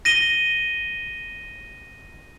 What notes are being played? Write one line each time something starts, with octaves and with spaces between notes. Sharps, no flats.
A#6 D#7 G7